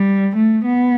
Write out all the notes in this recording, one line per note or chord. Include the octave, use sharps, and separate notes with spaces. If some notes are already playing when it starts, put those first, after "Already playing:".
Already playing: G3
A3
B3